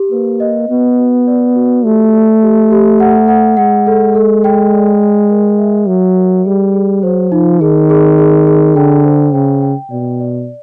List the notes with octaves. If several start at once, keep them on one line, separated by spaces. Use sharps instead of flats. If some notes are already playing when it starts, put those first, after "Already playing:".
Already playing: G4
A#3 B4
D#5
B3 F#4
F#4
D5
F#4
A3 G4
D5
G4
G4
F#5
F#5
G#3 F#5
A4
A4
G5
D5
G5
A#4
E5
F#3 E5
A#4
G3 G#4
G#4
F#3 C5
F3 D#4
D#3 G#4
G#4
G#4
G#4
D3 G5
C5
C#3 G5
G5
B2 D5
D5